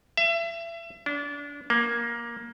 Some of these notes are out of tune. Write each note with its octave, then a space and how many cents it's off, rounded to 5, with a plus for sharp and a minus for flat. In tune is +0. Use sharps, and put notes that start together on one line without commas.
E5 +30
D4 -30
A#3 +15